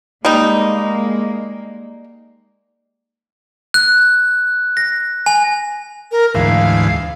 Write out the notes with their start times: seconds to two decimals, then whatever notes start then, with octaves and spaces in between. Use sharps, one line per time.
0.25 G3 G#3 A#3 D#4
3.74 F#6
4.77 A#6
5.26 G#5
6.12 A#4
6.35 D2 G#2 E3 F5